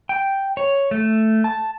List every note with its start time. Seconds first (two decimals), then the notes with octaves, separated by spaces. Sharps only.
0.09 G5
0.57 C#5
0.91 A3
1.44 A5